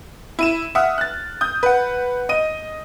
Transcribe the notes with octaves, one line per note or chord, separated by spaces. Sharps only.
E4 D#7 E7
E5 F#5 D#6 F6
F#6 A6
D#6 G6
B4 F#5
D#5 D#7